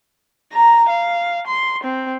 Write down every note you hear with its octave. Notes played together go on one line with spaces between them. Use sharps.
A#5
F5
C6
C4